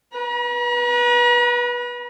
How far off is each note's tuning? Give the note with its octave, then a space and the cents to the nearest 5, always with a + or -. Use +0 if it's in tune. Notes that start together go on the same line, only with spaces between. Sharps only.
B4 -20 A#5 +45